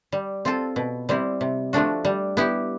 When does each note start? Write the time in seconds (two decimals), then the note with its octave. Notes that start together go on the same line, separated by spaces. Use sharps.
0.12 G3
0.45 C4 F4 A4
0.76 B2
1.09 G3 C4 E4
1.41 C3
1.73 F3 A3 D4 F#4
2.05 G3
2.37 B3 E4 G4